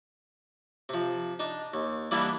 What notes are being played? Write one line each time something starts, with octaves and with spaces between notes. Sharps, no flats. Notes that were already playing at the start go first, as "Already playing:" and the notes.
C3 F3
D4 D#4
D#2
E3 G3 A#3 B3 D4 E4